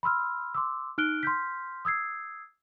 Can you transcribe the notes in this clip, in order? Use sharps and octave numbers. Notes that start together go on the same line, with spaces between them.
B5 C6 E6 F6
C6 D6 E6
D#4 F6 F#6 D7 G7
C6 F6 G6 B6
D#6 E6 G#6 C7